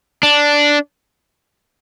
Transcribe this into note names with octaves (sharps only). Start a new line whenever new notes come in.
D4